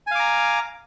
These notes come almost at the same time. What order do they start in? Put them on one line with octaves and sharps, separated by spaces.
G#5 F5 D6 A#5